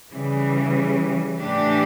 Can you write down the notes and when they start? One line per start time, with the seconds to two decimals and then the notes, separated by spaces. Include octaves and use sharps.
0.12 C#3 E3 G3
1.39 A2 E3 A3 D4 G4